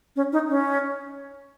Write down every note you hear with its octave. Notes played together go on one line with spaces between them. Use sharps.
C#4
D#4
C#4